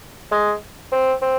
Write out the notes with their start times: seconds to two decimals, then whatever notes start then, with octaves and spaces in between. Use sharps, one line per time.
0.32 G#3
0.92 C4
1.22 C4